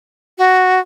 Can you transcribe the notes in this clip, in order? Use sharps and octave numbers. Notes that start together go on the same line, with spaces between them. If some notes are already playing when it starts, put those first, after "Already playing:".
F#4